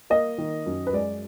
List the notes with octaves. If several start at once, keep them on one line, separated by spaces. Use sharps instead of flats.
A#3 D#5
D#3
F#2
B4
G#3 D5